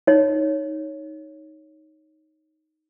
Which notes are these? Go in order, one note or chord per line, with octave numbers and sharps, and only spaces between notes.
D#4 C#5